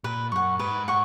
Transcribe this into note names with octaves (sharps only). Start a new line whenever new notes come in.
A#2 B4
F#2 F#5 C#6
G#2 B4
F#5 C#6